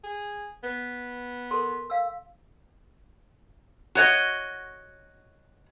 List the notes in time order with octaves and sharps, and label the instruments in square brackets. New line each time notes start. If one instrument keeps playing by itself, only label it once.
[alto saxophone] G#4
B3
[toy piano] A4 A#4 C6
F5 E6
[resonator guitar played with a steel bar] F#4 C#5 D#5